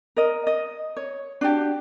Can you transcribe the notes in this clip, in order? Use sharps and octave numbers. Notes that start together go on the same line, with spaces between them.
A#4 D#5
D#5
C#5
D4 F#4 G4